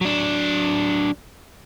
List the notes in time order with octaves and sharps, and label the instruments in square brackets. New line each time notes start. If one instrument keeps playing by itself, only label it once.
[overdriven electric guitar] F#3 D4